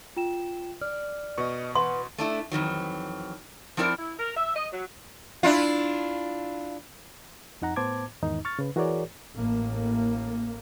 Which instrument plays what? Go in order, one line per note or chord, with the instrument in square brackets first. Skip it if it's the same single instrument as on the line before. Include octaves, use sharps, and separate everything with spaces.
[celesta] F4 G5 E7
[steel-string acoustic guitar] D5 [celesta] F6
[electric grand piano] B2 C#6 [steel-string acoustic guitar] B4 D#5
[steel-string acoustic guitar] E3 B4 [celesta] F#5 [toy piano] C6
[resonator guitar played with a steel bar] A3 D4 E4
F2 D#3 E3 F#3
F3 C4 E4 A#4 D5
[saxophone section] E4
A#4
E5
D#5
F#3
[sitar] D4 E4 F4
[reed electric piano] F2 D#4 F#5 A#5
A2 B3 C5 A5 D6 G#6
E2 G#2 D#3 D#4
C#6 F6 A6
C#3 B4
E3 F#4 G#4 A#4 C#5 D5
[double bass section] A1 A2 A#3